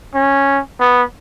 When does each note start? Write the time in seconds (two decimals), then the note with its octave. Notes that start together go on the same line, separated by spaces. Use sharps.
0.15 C#4
0.80 B3